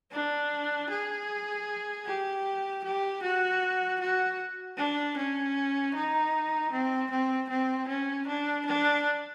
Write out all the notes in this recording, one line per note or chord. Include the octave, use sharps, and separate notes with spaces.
D4
G#4
G4
G4
F#4
F#4
D4
C#4
D#4
C4
C4
C4
C#4
D4
D4